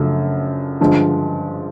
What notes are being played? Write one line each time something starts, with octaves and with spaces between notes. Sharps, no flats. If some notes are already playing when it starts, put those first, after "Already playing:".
Already playing: F#2 C#3 F3 A3 D4
G2 D3 F3 G#3